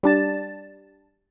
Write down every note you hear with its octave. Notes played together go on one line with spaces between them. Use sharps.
G3 D4 A5